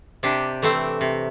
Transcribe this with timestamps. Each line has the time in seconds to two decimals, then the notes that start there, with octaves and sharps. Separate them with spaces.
0.23 C3 D4 G4
0.62 E3 A3 C4
1.01 C3